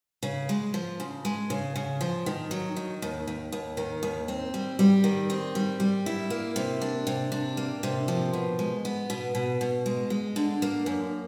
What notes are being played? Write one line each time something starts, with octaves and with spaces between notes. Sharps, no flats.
C#3
G#3
F3
C#3
G#3
C#3
C#3
F3
D#3
F#3
D#3
D#2
D#2
D#2
D#3
D#2
C4
G3
G3
D#3
C4
G3
G3
E4
A#3
C3
D4
C3
D4
A#3
C3
F3
B2
G#3
B3
B2
B2
B2
G#3
G#3
D3
A#3
F#2